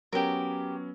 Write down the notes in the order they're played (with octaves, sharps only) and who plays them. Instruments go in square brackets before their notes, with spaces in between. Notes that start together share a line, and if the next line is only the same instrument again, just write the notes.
[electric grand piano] F#3 B3 C#4 [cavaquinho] G4 A#4